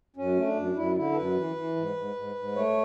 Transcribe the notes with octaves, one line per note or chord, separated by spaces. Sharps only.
F#2 C#4
A3
D4
F#2
F#2 E4
D3 E4
A4
F#2 B4
E3
E3
G#2
G#2
G#2
G#2
A3 C#5